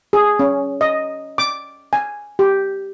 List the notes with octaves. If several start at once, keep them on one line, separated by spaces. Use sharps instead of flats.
G#4
C#4
D#5
D6
G#5
G4